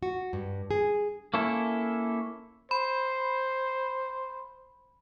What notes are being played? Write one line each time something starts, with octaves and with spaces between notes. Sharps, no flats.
F#4
G2
G#4
A#3 C#4 E4 A4
C5 B5